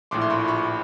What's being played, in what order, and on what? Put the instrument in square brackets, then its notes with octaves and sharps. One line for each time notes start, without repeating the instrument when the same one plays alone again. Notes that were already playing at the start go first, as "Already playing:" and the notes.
[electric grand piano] A#1 A2 F3 C6 D6
C6
B5 C#6
B5 C#6